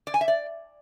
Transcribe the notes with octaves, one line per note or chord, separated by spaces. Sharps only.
D5
G#5
E5
D5